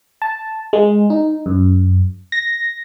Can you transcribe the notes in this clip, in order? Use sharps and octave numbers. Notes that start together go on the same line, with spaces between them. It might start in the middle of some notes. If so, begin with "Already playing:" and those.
A5
G#3
D#4
F#2
A#6